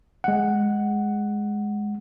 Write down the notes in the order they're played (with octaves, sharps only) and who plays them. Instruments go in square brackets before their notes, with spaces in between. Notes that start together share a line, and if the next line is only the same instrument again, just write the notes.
[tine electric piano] G#3 F#5